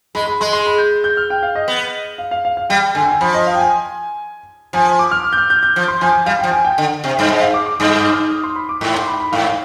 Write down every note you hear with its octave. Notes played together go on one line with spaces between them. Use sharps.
G#3 B5
B5
G#3 C6
C6
B5
G6
G6
F6
G5
F5
D#5
B3
F5
F5
F5
F5
G3 G5
D3 G#5
G5
G#5
F3 B5
D#5
F5
G5
G#5
F3 G#5
G#5
D6
F6
F6
G6
F6
G6
G6
F3
C6
F3 G#5
G#5
G3 F5
G5
F3
G#5
G5
D3
C3
G2
G#2 D#5
F5
D6
D6
G2 D#6
D#6
F6
D#6
C6
B5
D6
G#2
C6
B5
B5
G#2 F5
F5